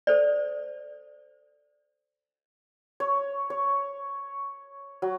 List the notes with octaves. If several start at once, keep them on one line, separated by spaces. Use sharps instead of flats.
A4 C5 D5
C#5
C#5
F#3